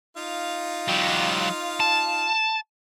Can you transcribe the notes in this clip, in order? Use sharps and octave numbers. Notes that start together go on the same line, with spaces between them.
D#4 F4 F5
F#3 G4
A5